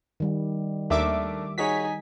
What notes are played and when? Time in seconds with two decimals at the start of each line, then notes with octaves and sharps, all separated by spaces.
0.20 D#3 G3
0.90 D#2 A3 D4 A#4 E5 D6
1.58 D#4 F#4 G#4 C#5 G#5 B6